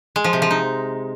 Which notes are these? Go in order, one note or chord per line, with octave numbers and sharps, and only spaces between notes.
G#3
F3
C3
F3
D#4